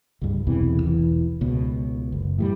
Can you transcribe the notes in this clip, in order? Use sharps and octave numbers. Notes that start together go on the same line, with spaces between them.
C#2 G2
B1 E2 C3 E3
E1 E3
C#2 B2
F#1
A2 F#3 G3